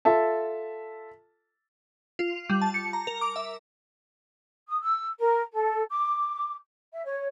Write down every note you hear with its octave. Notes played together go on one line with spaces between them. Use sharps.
F4 A4 E5 A5
F4
G3
A5
C#7
A#5
A#4
D6
E5
D#6
E6
A#4
A4
D6
E5
C#5